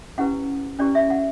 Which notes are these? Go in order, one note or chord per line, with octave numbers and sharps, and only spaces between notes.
C#4 E4 G4 B4 F#5
C#4 E4 G4 B4 D5
E5
F#5